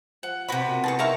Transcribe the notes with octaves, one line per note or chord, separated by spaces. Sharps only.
F3 F#5
C3 B3 F#4 B5
A#2
E3 F#4 G#4 A4 A5 C#6
D#4 E4 A#4 E5 F5 A#5 C#6